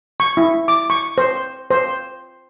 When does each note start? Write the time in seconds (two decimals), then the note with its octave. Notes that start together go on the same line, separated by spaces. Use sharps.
0.20 C#6
0.37 E4
0.68 D6
0.90 C#6
1.18 C5
1.70 C5